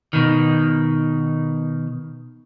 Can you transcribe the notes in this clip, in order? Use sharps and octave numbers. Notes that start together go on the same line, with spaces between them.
B2 D#3